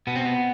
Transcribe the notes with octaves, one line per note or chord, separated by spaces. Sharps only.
B2 B3
C4
B3